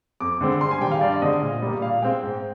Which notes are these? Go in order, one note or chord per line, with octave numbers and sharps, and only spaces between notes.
F2 D6
D3 G#3 C4
G2 C6
G#5
D#3 G3 G5
F5
G2 D5
D3 G#3 C4 D#5
A#2
G3 A#3
A#2 F5
G#3 C4 G5
G#2